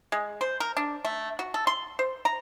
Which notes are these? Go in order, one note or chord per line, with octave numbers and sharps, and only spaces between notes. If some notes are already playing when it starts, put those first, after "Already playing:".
G#3
C5
A#4
D4
A3
F#4
A4
C6
C5
A#5